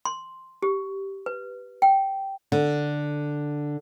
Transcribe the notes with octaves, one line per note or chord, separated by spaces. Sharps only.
C6
G4
B4
G5
D3